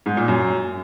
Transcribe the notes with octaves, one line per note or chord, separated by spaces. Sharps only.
G#2
A#2
F#2